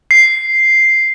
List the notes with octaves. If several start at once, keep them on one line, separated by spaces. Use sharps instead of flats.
C7